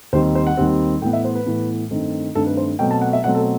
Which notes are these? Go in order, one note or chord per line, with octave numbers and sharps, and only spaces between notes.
D#2 D#3 G3 C4 C5
C5
F#5
D#2 D#3 G3 C4
A2 E3 B3 G5
E5
C5
B4
A2 E3 B3
G2 D#3 A3 C4
G2 D#3 A3 C4 A4
B4
C5
B2 F#3 A3 C4 G5
A5
F#5
E5
B2 F#3 A3 C4 F#5
A4